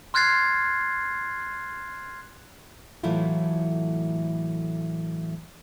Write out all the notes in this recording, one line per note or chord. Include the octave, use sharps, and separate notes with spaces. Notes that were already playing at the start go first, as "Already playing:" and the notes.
C6 F6 F#6 G#6 A6 C7
A2 E3 F#3 A3 E4 F4